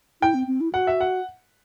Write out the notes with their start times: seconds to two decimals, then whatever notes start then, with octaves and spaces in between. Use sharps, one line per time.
0.22 E4 G5
0.34 C4
0.47 C4
0.61 E4
0.73 F#4 F#5
0.87 E5
1.00 F#5